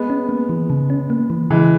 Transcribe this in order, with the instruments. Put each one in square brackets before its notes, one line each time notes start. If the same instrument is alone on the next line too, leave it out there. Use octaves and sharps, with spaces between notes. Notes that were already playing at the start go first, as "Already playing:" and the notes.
Already playing: [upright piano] G#3 B3
[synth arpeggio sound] C#4
A#3
E3
C#3
C#4
A#3
E3
[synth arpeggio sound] C#3 [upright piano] E3 G#3